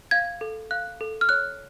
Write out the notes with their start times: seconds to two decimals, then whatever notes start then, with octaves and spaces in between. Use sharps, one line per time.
0.11 F5 G#6
0.41 A4
0.71 F5 F#6
1.01 A4
1.21 F6
1.29 C#5 F#6